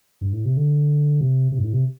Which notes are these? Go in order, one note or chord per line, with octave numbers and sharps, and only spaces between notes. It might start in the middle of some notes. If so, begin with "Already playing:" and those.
G2
A2
C3
D3
C3
C3
G2
A2
C3